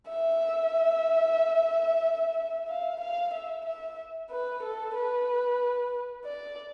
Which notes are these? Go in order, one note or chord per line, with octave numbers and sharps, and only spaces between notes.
E5
F5
F5
E5
E5
B4
A4
B4
D5